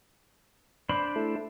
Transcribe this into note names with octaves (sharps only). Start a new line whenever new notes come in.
D4 C5 B5
A3 E4 A4